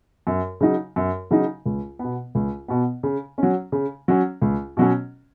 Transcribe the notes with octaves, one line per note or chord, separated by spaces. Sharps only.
F#2
C#3 F#3 D#4
F#2
C#3 F#3 D#4
C#2
B2 B3
C#2
B2 B3
C#3
F#3 C#4
C#3
F#3 C#4
C#2
B2 F#3 C#4